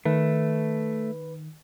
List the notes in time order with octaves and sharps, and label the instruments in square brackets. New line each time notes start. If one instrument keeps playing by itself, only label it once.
[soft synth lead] D#3 [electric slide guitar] A3 [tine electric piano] B4